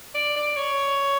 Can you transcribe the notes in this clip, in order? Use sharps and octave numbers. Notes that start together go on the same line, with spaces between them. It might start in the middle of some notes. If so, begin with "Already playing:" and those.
D5
D5
C#5